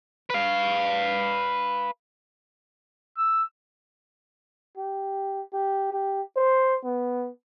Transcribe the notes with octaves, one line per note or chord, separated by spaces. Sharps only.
B4 F5
E6
G4
G4
G4
C5
B3